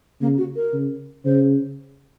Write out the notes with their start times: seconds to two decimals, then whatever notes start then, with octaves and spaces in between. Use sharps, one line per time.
0.21 C#3 A#3
0.38 F#4
0.56 A#4
0.73 C#3
1.25 C#3 C5